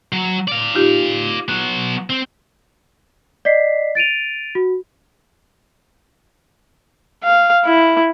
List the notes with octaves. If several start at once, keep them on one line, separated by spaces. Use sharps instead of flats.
F#3
D5 F5
D#4 F4 G4
F#3 B3 F#6
C4
D5 D#5 B6 C7
A6 D7 D#7 F7
F#4
F5
E4